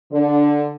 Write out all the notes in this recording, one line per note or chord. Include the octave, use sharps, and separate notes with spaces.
D3